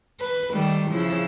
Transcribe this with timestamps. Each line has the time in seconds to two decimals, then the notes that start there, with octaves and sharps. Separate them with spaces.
0.20 B4
0.52 D#3 G3 A3
0.90 C#3 F3 E4